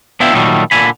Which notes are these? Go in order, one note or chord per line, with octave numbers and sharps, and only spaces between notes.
B3 D4 E4 F4 E5 G5
A#2 D#3 F#3 G3 A3
A#2 D3 G#5 B5